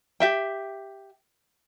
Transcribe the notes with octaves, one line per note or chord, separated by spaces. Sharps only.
G4 E5 G5